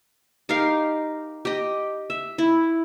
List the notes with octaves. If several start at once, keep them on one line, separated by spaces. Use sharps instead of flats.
D#4 G4 A#4 F5
G4 D#5
E5
E4